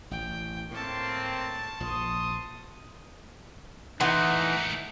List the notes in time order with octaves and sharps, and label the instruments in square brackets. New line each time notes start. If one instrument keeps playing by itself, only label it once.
[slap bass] A1 [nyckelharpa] G5
[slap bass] A2 [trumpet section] A#3 C4 [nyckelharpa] A5 C#6
[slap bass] A#1 F3 [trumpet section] C6 D#6
[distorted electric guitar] D#3 A3 [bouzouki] E3 [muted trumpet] D#4 [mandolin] D#5 F#5 C6